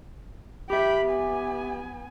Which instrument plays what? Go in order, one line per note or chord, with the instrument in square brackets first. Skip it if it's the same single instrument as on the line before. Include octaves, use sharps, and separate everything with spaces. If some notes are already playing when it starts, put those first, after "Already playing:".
[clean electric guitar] G4 E5 [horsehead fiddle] G5 B5
[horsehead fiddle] B3 G#5